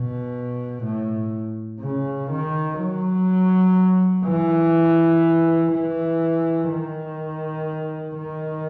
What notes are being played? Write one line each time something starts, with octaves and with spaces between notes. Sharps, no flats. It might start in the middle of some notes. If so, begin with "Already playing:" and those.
Already playing: B2
A2
C#3
D#3
F#3
E3
E3
D#3
D#3